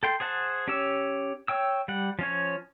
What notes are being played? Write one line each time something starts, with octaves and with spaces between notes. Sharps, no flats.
A4 G5 C6
G#4 C5 F#5 A5
C#4 G4 C#5 E6
C#5 G5 E6
G3 F#5
F3 C#4 C#5